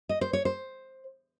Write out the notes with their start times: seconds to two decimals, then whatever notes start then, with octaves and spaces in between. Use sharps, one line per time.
0.09 D#5
0.21 C5
0.33 C#5
0.45 C5